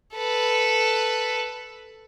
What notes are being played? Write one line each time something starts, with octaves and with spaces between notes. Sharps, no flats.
A4 B4